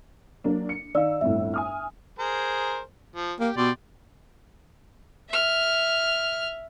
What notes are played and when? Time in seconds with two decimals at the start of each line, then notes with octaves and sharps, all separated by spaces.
0.44 F#3 A#3 D4
0.69 C#7
0.95 D#3 D5 F5 E6
1.21 G1 F2 A2 E5
1.54 G#5 D#6 F6
2.19 G#4 A#4 C5
3.16 F3
3.40 A#3 G4
3.57 B2 G4 D5 C6
5.29 E5 F6